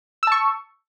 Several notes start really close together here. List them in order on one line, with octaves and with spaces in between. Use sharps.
E6 A5 C#6